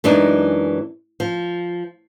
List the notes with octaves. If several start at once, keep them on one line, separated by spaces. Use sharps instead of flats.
F#2 E3 G#3 D4 D#4
F3